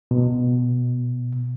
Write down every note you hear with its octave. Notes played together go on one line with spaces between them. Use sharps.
B2